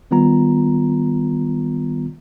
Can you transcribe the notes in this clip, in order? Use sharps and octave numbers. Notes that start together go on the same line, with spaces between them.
D#3 G3 B3 F4 A#5